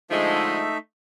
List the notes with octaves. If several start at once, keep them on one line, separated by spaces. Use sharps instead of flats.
D3 F3 G#3 A3 D#4 E5